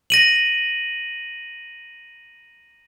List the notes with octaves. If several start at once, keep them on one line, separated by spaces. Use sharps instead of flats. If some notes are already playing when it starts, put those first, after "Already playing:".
A#6 D#7 F#7